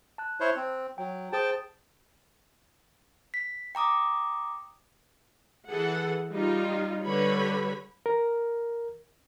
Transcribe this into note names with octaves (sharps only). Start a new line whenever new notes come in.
A5 F#6
E4 C5 C#5
C4
F#3 G5
G#4 C5 G5 A5 D#6
B6
G5 A#5 D6 D#6
E3 G#4 A4 F#5
G3 D#4 F4
D3 G3 G4 B4 C#5 B5
A#4